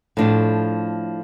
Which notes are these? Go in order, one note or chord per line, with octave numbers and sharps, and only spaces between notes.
A2 F3 A3 D4